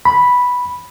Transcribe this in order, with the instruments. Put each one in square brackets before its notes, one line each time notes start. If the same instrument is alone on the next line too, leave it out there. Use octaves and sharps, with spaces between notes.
[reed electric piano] B5